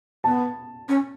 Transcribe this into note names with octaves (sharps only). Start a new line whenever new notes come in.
B3 A5
C#4